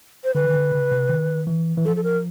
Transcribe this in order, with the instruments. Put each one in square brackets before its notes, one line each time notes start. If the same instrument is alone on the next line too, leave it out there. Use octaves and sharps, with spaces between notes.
[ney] C5
[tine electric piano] D3 [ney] B4
[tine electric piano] D#3
D3
C#3
C3
D#3
E3
E3
[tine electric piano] F3 [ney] A4
[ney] A4
A#4